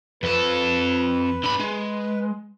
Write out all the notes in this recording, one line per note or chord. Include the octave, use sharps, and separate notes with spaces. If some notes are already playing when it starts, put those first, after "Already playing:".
F2 A4 B4
D3 B5
G#3